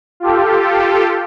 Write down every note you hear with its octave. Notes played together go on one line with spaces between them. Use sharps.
F4 G4 A4